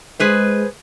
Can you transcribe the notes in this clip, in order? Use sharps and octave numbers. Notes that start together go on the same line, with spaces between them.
G#3 G#4 B4 C5